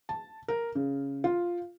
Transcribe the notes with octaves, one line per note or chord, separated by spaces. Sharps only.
A5
A#4
C#3
F4